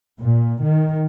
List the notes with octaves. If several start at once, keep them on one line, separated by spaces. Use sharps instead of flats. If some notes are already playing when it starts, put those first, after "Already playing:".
A#2
D#3